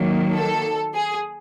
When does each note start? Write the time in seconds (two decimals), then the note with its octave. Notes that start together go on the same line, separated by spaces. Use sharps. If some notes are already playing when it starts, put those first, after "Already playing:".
Already playing: D#3 F#3 A#3
0.35 A4
0.94 G#4